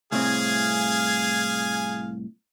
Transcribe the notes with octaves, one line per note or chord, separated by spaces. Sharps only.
C2 A2 C4 G#4 F5 G#5